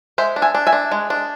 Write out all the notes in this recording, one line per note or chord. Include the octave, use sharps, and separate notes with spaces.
G#3 C5 E5
D4
E5 G#5
D4
E5 G#5
D4
G#3
D4